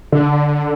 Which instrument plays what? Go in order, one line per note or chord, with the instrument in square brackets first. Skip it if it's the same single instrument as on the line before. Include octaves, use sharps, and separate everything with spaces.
[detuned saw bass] D3